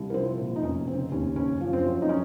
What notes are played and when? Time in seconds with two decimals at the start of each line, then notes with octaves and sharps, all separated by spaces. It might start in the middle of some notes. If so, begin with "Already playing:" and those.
Already playing: C2
0.10 A#4
0.14 F3 C4 C5
0.39 A#2
0.56 D#4
0.63 F1 C#4
0.87 C#3 C4
1.11 D#2 C#4
1.36 F#1 C#4
1.61 F3
1.73 C4
1.85 F#2
2.02 D#4
2.09 C#4